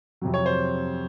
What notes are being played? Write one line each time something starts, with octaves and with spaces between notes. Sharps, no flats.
F2 C3 F#3
C#5
C5